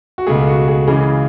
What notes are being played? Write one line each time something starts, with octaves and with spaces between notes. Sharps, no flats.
F#4
C#2 B2 A3 G#4
F#4
G#4
C#2 C#3 E3 G#4